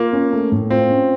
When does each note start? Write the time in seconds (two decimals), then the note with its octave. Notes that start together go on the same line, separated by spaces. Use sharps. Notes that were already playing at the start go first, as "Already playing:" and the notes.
Already playing: A#3 F4
0.13 C#4
0.33 A3
0.52 A2
0.70 C4 F4
0.90 C#4